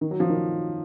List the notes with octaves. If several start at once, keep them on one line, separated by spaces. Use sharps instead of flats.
D#3
F#3
F3
D#3